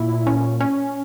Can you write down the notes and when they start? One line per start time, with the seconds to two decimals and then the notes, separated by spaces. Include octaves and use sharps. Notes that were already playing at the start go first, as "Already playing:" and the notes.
Already playing: A#2 E4
0.27 C#4
0.60 C#4